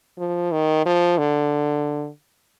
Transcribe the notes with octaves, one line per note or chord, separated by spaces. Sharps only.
F3
D#3
F3
D3